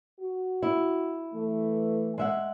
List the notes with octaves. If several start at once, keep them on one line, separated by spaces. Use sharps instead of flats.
F#4
E4
E3 A3
G#3 E5 F#5